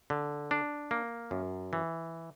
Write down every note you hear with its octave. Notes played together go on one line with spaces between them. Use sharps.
D3
D4
A#3
F#2
E3